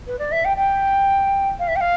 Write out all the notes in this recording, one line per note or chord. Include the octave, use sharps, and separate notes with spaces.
B4
D5
E5
G5
G5
F5
E5
G5
F5